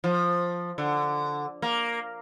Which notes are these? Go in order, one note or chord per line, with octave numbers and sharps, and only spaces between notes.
F3
D3
A#3